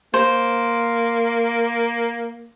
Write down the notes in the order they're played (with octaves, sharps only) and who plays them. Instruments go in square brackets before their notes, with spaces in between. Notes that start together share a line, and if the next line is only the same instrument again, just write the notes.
[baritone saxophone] A#3 [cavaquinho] C5